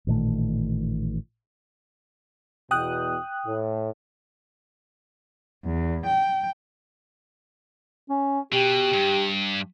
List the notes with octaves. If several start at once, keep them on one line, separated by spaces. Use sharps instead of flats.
A1 A#2 D#3 A3
E2 B2 G5 D#6 F#6
A2
E2
G5
C#4
B2 G4
G2